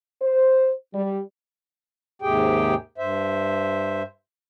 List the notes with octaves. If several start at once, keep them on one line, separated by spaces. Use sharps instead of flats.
C5
G3
D#2 G#2 C3 G4 G#4 G5
G2 C5 E5